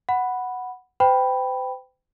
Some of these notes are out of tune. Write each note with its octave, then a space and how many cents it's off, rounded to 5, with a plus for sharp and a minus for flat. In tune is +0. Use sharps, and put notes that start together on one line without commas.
F#5 +0 B5 +0
C5 -45 G5 +0 B5 +0